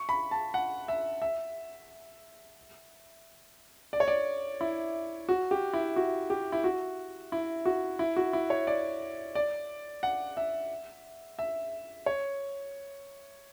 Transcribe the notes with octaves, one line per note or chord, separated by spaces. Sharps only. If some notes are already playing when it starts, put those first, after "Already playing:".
Already playing: C#6
B5
A5
F#5
E5
E5
D5
C#5
D5
E4
F#4
G4
E4
F#4
G4
E4
F#4
E4
F#4
E4
F#4
E4
C#5
D5
D5
F#5
E5
E5
C#5